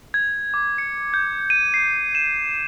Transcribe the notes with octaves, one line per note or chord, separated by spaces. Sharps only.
G#6
D6
C#7
G6
D#7
C7
E7